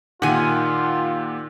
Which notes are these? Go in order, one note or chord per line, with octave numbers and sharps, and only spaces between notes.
A#2 D#3 F4 G4 F#5 G#5